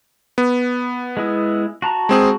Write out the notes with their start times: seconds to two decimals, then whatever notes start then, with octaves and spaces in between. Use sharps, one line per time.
0.38 B3
1.17 G#3 E4
1.82 F#4 A5 A#5
2.09 G#3 C4 G#4